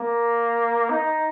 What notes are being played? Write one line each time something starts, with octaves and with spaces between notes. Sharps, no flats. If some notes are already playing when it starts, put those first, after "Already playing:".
Already playing: A#3
D#4